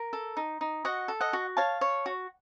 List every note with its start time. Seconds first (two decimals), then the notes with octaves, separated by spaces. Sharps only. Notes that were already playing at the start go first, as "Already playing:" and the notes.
Already playing: A#4
0.13 A4
0.37 D#4
0.61 D#4
0.85 F#4 D#5 F#5
1.08 A4
1.21 D#5 F#5
1.33 F#4
1.57 C#5 F5 A5
1.81 C#5
2.06 F#4